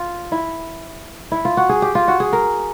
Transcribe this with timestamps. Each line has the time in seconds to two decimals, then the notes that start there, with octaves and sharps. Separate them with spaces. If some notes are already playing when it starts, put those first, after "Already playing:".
Already playing: F4
0.32 E4
1.32 E4
1.45 F4
1.57 F#4
1.69 G#4
1.82 G4
1.95 F4
2.08 F#4
2.20 G#4
2.33 A#4